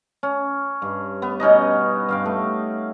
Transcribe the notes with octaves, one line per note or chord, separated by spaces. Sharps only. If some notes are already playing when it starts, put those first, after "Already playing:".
C#4
G2
B3
B2 C#4 D#4 D#5
G2 F5 G5
A3